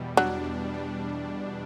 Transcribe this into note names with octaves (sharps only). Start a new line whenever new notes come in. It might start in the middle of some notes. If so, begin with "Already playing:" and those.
Already playing: E2 B2 G3
F#3 D4
E2
G3